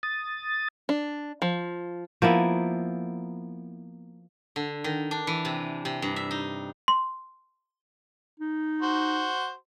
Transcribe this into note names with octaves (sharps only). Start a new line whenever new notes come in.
D#6 A6
D4
F3
F3 A#3 B3 E4
D3
D#3
D4
E3
C3
C3
G2
E5
D#4
C6
D#4
F#4 C5